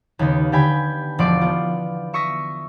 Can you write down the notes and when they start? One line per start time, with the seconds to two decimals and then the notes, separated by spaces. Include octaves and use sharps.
0.19 D#2 C#3 B3 D#4
0.52 D3 G4 G5 G#5 B5 G6
1.19 E1 F3 D5 C6 D6 A6
1.41 B3 F4
2.14 E5 C#6 D#6 A#6 B6